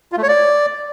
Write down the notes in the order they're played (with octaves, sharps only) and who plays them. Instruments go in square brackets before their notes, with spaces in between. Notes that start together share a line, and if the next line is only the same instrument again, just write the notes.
[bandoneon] F4
A3
C#5
D5